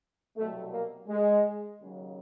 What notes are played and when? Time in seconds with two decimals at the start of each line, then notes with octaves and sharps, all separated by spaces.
0.37 C2 B2 F#3 A3
0.73 A#3
1.08 G#3
1.79 D#2 C#3 F#3